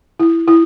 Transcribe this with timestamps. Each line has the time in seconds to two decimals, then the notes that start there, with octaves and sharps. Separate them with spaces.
0.20 E4
0.48 E4